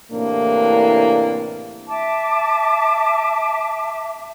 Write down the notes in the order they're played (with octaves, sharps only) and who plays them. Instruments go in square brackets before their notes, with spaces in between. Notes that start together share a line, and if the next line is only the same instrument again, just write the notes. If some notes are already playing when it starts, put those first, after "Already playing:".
[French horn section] A2 C3 E3 A#3 D4
[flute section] E5 A5 D6